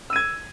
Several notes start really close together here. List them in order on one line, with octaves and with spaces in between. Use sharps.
E6 D#7 G#6